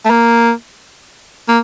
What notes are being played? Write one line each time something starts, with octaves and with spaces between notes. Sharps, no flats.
A3
A#3
A#3